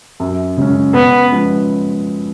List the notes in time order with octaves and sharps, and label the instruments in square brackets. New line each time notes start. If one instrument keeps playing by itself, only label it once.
[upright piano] F#2
C#3 G#3 C#4
[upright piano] C#3 [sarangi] B3
[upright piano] F3 G#3 C#4